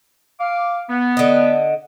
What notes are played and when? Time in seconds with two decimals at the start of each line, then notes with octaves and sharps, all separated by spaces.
0.40 F5 D6
0.90 B3
1.17 D3 D#5